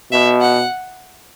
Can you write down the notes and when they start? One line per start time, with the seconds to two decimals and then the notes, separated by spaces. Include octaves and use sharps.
0.12 B2 E5
0.41 F#5